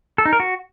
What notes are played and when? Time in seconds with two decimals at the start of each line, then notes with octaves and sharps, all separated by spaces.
0.18 A4
0.25 D#4
0.33 A#4
0.40 F#4